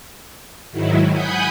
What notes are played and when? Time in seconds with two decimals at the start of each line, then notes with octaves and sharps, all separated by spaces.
0.71 G#2 D#3 F#3 E4
1.10 F#5 G#5 B5 D#6 G6